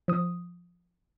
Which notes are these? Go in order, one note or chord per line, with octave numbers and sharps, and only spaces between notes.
F3 D#6